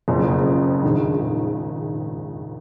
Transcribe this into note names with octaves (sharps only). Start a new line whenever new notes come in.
F#1 F2 C#3 F3
A#1 G#2 D#3